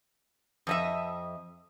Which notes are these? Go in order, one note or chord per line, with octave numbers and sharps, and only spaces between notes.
F2 D#5 E5